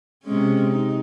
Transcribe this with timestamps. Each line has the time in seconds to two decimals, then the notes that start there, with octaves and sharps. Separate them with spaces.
0.24 C3 G#3 C#4
0.68 D#4